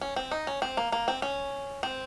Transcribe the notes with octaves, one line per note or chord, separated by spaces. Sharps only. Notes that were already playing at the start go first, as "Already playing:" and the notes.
C#4
C4
D#4
C#4
C4
A#3
A#3
C4
C#4
C4